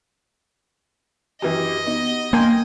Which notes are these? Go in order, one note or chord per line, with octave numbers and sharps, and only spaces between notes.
F#2 E3 G4 D#5
B3 D#4
A#3 G5 G#5 C6